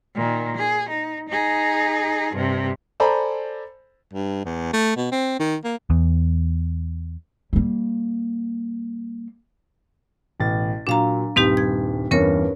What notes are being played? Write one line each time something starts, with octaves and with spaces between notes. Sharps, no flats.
A#2 D#3
G#4
D#4
D#4 G#4
G2 C3
A4 C5 D5 G#5 A#5 B5
G2
E2
A3
B2
C4
D#3
A#3
E2
G3 A#3
A1 B2 A6
A#2 F#3 D4 F5 A#5
D#1 G2 C4 D#4 G4 B6
G#6
E2 G2 C#4 A#4 C#5